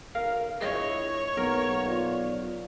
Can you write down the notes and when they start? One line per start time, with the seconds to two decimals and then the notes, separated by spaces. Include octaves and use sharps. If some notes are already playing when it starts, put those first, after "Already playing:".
0.15 B1 A#4 F5
0.60 A#1 E4 G#4 C#5 D#5 E5
1.37 B1 A3 A#3 A#4 F#5
1.86 F4 D5